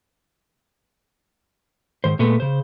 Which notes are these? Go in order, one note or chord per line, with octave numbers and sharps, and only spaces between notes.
G#2 D#3 C5
A#2 G#3 A3 B3
C#3 C5